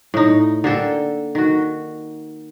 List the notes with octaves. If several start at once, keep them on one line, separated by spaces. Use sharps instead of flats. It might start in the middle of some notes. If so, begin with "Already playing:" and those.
A2 D#4
D3 A#3 A4 G5
D#3 F#4